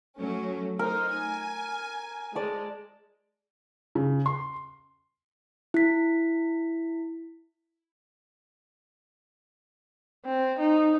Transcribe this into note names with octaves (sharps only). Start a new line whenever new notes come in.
F#3 A3 C#4
A3 D#4 A#4 C5
G#5
G#3 D5 A5
C#3
C6
E4 B6
C4
D#4